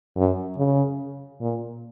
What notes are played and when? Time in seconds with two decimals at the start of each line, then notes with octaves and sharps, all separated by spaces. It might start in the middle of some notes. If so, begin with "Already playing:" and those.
0.17 F#2
0.58 C#3
1.41 A#2